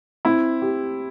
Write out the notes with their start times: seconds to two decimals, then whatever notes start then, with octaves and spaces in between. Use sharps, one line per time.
0.25 C4 E4
0.62 G4